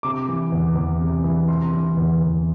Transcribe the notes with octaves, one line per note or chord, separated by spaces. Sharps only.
C3 D6
E3
E2
E2
C3
E3
C3 C6
E3
E2
E2